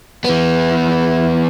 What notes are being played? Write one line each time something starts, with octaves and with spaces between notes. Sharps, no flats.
E3 B3